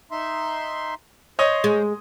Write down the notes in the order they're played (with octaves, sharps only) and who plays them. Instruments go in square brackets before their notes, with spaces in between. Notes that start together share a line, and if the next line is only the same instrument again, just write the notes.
[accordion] D#4 E5 C6
[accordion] C5 [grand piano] C#5 D#5 D#6
[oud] G#3